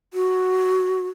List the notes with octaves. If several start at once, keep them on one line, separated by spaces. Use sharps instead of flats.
F#4